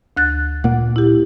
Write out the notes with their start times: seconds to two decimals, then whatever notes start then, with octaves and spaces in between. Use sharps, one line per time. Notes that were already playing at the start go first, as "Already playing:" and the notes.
0.17 D2 F#6 A6
0.64 A#2 A#3 F#5
0.96 E4 G4